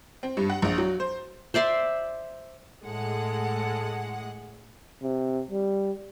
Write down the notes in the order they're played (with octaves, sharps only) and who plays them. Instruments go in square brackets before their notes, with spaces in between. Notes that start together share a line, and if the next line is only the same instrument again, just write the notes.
[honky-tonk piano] C4
G2
F#5
A#1
F#3
C5
[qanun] C5 D5 E5 C6
[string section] A2 G#3 F#5 [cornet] A4
[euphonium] C3
G3